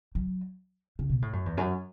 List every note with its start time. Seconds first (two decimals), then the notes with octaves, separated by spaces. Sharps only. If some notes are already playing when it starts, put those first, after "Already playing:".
0.15 F#3
0.99 C#3
1.10 B2
1.22 A2
1.33 F#2
1.46 E2
1.57 F#2